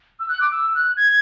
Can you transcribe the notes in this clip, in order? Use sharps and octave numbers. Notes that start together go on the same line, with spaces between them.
E6
F#6
D6
E6
F#6
G#6